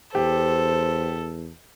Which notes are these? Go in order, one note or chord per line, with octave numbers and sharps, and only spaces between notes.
E2 G4 A4 C5